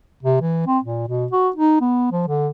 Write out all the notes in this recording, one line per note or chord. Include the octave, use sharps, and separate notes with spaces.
C3
E3
C4
A#2
B2
F#4
D#4
B3
F3
D3